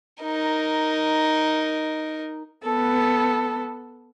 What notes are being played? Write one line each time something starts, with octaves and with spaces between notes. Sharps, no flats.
D#4 A#4
B3 A4